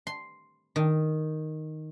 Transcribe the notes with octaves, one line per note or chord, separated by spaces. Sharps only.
C6
D#3